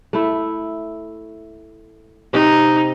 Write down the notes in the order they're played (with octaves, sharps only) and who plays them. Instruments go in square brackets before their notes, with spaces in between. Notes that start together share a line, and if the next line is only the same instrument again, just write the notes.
[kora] A3 E4
[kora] C3 C4 [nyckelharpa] D#4